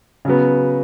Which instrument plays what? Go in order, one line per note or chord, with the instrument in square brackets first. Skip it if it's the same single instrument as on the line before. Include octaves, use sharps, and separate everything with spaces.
[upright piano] C#3 F#3 B3